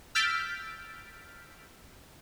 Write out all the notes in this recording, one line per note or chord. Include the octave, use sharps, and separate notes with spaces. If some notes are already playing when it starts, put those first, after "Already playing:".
E6 F6 G6 A6 B6 D7